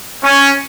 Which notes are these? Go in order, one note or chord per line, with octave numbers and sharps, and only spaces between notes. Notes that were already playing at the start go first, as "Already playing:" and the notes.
C#4